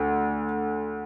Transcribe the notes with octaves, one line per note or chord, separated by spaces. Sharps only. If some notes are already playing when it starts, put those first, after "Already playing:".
Already playing: D2